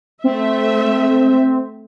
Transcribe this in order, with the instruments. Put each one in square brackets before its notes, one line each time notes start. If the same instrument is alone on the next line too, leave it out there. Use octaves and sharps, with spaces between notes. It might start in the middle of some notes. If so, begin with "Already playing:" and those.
[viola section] A3 E5 [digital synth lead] C4